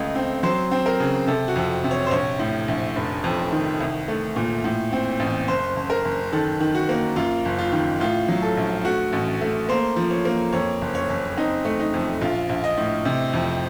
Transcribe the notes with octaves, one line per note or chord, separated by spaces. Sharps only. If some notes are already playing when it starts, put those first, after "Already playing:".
Already playing: C#2 A3 D#5
C4
F#3 C5
C4
A#4
C#3
C3 A4
F#4
F2
C3
C#5
C5
A#1 C#5
A2
A#1
F1
F2
D#3
C2
A3
A#2
A2
C4
A1
F#1 C5
F#1
A#4
F#1
D#3 A4
D#3
F#4
A#3
F#2 F4
F#1
F4
D#3
A2 F4
F#3
A4
A#1
A3 F#4
A1
A3
A#3 C5
F3
C#5
A#3
F2 C#5
F#1
C#5
F#1
C4 D#4
A3
D#4
F2
A#1 F4
A#1
D#5
A2
C3
F2